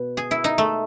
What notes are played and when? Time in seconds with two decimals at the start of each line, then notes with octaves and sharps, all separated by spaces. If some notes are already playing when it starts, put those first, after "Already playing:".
Already playing: B2 B4
0.17 G#4
0.31 E4
0.44 D#4
0.58 A3